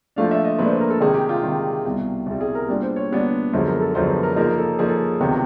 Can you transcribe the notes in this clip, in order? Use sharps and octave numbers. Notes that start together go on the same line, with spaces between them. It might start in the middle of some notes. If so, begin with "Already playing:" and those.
A#2 F3 A3 D4 F5
E5
D#5
A#2 F3 A3 D4 B4
C5
A#4
A4
C3 D#3 G#3 G#4
G4
F4
C3 D#3 G#3
C2 B2 G3
C2 B2 G3
G#4
A#4
A#2 G3 B3 D4
C5
C#5
A#2 G3 B3 D4
F#2 D3 F3 G#3 B3 C5
A#4
A4
F#2 D3 F3 G#3 B3 C5
B4
A#4
C#3 F3 A#3 D#4 A#4
A4
C#3 F3 A#3 D#4 G#4
A4
C#2 C3 D#3 F#3 B3